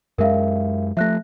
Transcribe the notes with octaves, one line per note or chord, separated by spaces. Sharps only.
F#2 G#3 A#4 E5 F5
F3 A3 E5 F#6 A#6